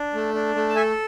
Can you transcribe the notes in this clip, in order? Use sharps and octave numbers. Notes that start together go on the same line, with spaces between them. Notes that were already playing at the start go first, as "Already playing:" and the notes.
Already playing: D4
A3
D4
A3
A5
A4 E5 G#5